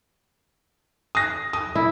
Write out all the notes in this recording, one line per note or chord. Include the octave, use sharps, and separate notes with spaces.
D#6 A#6
D#6
E4